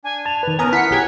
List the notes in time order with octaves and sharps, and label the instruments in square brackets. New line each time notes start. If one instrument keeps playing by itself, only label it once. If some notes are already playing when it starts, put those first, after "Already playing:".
[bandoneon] D4 [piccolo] G#5
[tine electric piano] A5 [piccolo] F7
[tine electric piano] D#3 B4
[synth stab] B3 A#5 D#6 [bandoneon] C#4 A#4 [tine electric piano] G#5
[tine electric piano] E4 [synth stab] F#5 C#7 [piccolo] B6
[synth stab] B1 G4 G#6 [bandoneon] G#4 F#5 G#5